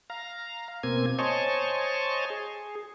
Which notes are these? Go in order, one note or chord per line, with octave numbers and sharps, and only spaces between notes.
F5 A#5
B2 A#3 C4 G#5 G#6
C5 C#5 D#5 G#5 A5 C#6
G#4